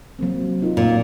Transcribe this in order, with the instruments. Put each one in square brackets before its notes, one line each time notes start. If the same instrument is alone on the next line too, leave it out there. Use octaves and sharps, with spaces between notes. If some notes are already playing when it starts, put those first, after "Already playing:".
[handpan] F#3 A#3 C4
D#4 F4 A#4
[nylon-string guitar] A#2